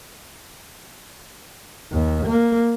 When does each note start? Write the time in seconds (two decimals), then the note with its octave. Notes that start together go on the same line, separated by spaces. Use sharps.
1.92 D#2
2.26 A#3